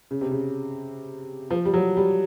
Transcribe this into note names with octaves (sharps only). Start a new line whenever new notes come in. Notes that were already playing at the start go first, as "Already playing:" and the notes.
C#3
C3
C#3
F3
G3
F#3
G3